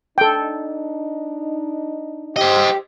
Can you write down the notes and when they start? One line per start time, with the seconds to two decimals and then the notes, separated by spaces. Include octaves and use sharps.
0.18 D4 D#4 A4 G5
2.36 G4 C5 D#5